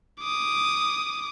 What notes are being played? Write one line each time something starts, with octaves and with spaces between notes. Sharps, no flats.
D6 D#6